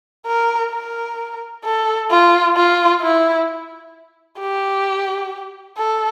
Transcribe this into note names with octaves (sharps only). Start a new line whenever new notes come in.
A#4
A#4
A4
F4
F4
E4
G4
A4